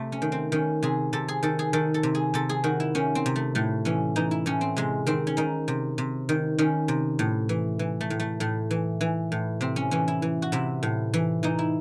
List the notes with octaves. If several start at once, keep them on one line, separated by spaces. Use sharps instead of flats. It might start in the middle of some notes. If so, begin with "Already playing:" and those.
Already playing: C3 A3
C#4
D#3
C4
D#3 C#4
C3 G#4
C3 A4
G#4
D#3 A4
G#4
D#3 A4
A4
C3
G#4
C3 A4
G#4
D#3 F#4
E4
D#3 C#4
C4
C3
A3
A2 A3
E3 C#4
E3 D#4
E4
A2 C#4
C4
C3 G#3
D#3 C4
C#4
D#3 D#4
C3
C3
D#3
D#3 C#4
C3
A2
E3
E3
A3
A2
A3
A2 A3
E3
E3
A2
C3 C4
C#4
E3 C#4
E4
E3
F#4
C3 E4
A2
E3
E3 D#4
E4